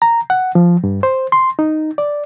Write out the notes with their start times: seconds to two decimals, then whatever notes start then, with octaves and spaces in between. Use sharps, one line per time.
0.02 A#5
0.30 F#5
0.55 F3
0.84 G2
1.03 C5
1.32 C6
1.59 D#4
1.98 D5